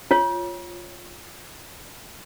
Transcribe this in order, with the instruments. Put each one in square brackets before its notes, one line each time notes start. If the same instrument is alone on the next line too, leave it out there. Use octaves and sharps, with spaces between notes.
[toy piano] F4 C#5